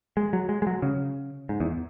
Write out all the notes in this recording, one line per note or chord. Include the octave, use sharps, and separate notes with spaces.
G#3
F#3
G#3
G#3
F#3
C#3
G#2
E2